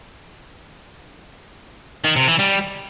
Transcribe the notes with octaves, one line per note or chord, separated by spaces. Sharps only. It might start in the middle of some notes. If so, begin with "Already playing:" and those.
D#3
C3
E3
G3